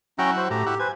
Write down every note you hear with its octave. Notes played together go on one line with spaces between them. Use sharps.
F#3 C#4 E4 F#4 G5 A#5
C5
A2 G4 A#5
E4 F#4 G4
B4 C5 G#5